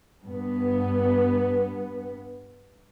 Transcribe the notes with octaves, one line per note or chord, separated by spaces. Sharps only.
G2 B3